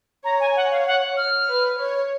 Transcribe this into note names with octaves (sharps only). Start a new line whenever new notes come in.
C#5 A#5
G#5
F#5
F5
F#5
F6
B4
C#5